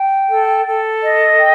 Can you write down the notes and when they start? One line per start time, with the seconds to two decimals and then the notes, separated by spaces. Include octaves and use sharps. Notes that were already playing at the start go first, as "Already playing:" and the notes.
Already playing: G5
0.29 A4
0.66 A4
1.02 D#5
1.39 G5